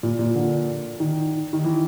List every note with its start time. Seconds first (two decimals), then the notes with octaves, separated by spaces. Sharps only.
0.03 A#2
0.19 A#2
0.35 D3
1.00 D#3
1.53 D#3
1.64 E3